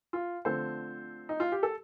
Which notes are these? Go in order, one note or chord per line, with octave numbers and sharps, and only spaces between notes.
F4
D3 F3 A3 C4 A4 C5
D#4
F4
G4
A4